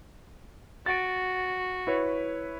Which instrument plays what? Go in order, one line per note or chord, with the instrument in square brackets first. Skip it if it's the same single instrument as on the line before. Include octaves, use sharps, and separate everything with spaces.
[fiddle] F#4 [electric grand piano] A6 D7
[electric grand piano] E4 B4 C#5